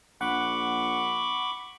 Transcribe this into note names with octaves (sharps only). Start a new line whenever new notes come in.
A#1 F#5 B5 C#6 D6